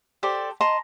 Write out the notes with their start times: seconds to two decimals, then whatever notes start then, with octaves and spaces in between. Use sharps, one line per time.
0.23 G4 A4 C5 D5
0.61 D#5 A5 A#5 C6